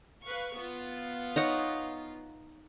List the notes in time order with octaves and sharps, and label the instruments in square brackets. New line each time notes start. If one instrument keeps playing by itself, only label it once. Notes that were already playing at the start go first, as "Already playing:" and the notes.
[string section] B4 F5 C#6
B3 F4
[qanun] D#4 C#5 F#5